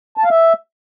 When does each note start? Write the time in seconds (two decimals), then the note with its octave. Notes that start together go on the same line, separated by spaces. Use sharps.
0.17 A5
0.24 F5
0.30 E5